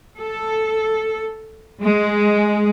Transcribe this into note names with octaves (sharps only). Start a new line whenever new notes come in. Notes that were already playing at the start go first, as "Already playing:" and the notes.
A4
G#3